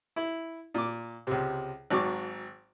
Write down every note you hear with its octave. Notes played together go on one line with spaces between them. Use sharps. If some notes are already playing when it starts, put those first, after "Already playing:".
E4
A#2 D6
C#2 C3
G#1 G#2 F#3 C#6 D6